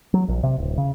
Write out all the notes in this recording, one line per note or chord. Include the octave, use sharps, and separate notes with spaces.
F#3
A#1
C3
D1
C#3